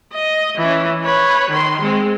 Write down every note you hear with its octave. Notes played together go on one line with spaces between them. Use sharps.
D#5
E3 C#4
B4 C#5
D#3 C6
G#3 C4